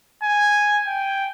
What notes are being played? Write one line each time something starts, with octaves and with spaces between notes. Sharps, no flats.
G#5
G5